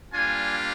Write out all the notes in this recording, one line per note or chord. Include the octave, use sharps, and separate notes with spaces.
G3 A#3 D4 F4 G#5